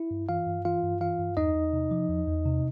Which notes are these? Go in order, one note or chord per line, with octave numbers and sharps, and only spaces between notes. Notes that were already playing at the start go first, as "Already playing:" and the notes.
Already playing: E4
G2
E3 F4 F5
G2
E3 F4 F5
G2
E3 F4 F5
G2
E2 D#4 D#5
E2
C3
F3
E2
E2
C3